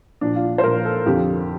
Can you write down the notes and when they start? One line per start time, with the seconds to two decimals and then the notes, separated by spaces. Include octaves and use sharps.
0.21 A#2 F3 D4
0.36 F4
0.58 C5
0.64 A#2 F3 A#4
0.85 A4
1.06 F2 D3 F3 G4